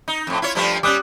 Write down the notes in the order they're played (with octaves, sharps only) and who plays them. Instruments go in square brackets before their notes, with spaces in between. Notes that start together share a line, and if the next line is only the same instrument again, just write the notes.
[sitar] D#4
F2 A2
E4 F4 C#5
G2 F3 A3
[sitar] G3 C#4 [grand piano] D6 D#6 F#6